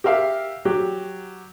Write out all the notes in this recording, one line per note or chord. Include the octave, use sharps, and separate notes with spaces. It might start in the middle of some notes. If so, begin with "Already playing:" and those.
G4 A#4 E5 F5
F#3 G4